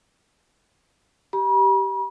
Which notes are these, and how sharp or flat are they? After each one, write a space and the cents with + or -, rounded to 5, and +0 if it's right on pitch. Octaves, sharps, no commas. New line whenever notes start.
G4 -10 B5 -45